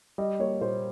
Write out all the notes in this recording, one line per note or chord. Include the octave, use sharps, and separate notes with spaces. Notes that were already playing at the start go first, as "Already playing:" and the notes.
G3 D#5
A#3 C#5
A#2 C5